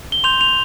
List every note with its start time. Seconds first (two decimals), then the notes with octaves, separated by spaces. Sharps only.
0.12 G7
0.24 C6 G6 F7
0.41 F7